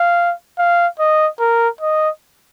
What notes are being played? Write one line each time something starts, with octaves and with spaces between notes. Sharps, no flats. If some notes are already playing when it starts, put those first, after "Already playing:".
Already playing: F5
F5
D#5
A#4
D#5